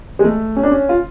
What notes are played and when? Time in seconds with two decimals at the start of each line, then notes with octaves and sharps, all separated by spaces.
0.19 G#3
0.24 A3
0.56 C#4
0.63 D4
0.71 C#4
0.89 F4